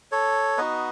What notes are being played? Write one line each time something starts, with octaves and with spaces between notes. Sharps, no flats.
A4 C#5
B3 D#4 F#4 B4 D#5